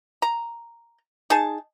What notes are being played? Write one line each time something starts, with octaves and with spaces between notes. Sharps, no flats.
A#5
D#4 G#4 A5